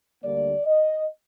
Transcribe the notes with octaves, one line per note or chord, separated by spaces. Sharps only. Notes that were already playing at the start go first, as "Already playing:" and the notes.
D2 D3 G3 A#3 D5
D#5